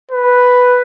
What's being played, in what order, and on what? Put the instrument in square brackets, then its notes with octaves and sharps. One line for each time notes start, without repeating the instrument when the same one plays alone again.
[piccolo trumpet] B4